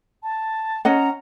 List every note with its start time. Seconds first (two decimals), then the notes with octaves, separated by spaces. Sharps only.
0.23 A5
0.85 C#4 D#5 F#5 A#5